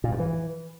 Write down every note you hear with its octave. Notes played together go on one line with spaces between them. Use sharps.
A#2
G2
E3